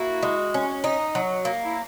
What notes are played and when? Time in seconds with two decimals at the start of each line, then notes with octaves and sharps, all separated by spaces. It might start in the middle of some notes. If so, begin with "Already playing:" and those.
Already playing: A#3 E4 F#4
0.23 G#3
0.54 C#4
0.84 D#4
1.15 F#3
1.45 A#3
1.65 E4